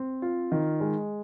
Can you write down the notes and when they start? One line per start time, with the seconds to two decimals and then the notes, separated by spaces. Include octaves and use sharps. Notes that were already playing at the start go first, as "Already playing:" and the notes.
Already playing: C4
0.22 F4
0.52 D#3
0.80 G#3